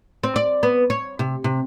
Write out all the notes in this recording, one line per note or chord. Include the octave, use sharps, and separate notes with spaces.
C4
D5
B3
C#5
C3
C3